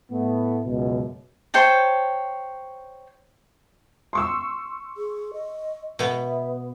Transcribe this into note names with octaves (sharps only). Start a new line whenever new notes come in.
A2 A3 B3
C#2 F#2 B2
C5 C#5 G5 A5
C6 C#6 E6
G#4
D#5
B2 B3 E5